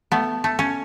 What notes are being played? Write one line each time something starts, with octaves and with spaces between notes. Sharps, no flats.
A3 B3
A3
C#4